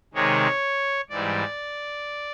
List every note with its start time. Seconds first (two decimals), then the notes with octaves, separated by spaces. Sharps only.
0.14 C3 D#3 G#3 C#5
1.10 G#2 E3 G3 D5